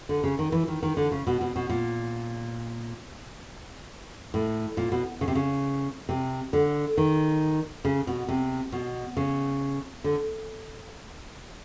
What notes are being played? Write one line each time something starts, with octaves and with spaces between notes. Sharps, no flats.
D3
C#3
D#3
E3
D#3
D#3
D3
C#3
B2
B2
B2
A#2
A2
A#2
B2
C#3
C3
C#3
C3
D3
D#3
C#3
B2
C3
B2
C#3
D3